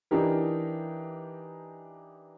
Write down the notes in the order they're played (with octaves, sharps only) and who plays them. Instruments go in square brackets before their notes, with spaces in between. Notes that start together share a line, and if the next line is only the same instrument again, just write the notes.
[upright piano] E3 D4 D#4 G4 A#4